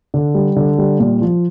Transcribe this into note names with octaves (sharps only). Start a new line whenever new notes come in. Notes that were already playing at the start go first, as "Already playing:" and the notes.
D3
G3
D3
G3
A#2
F3